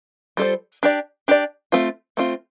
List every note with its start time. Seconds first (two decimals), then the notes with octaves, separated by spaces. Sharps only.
0.37 G3 F4 A4 C5
0.83 D4 G4 D5
1.28 D4 G4 D5
1.72 A3 C4 F4
2.17 A3 C4 F4